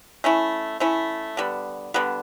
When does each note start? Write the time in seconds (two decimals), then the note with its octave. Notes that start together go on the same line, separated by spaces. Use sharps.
0.24 A3 C#4 E4
0.80 A3 C#4 E4
1.37 D3 G3 B3
1.94 D3 G3 B3